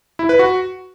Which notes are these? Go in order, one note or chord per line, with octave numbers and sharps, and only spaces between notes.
E4
B4
F#4